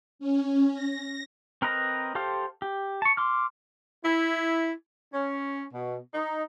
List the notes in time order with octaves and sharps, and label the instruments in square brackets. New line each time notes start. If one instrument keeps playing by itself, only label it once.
[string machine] C#4
A#6
[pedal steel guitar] C4 A#4 B4 D#5 A#5
G4 A4 C5 F5
G4
A5 C#6
C6 D6 F6
[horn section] E4
C#4
B2
D#4